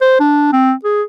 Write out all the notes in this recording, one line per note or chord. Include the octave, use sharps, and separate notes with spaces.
C5
D4
C4
G#4